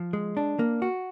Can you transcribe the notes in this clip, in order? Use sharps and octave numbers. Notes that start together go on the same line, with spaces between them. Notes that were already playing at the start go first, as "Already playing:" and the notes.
Already playing: F3
G#3
D4
A#3
F#4